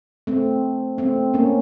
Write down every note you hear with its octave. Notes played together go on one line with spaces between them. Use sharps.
A3 C4
A3 C4
A#3 C#4